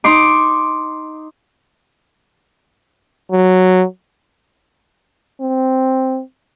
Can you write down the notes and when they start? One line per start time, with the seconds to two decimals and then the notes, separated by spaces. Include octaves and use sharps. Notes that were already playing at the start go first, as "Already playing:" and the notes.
0.04 D#4 C6 D6
3.32 F#3
5.41 C4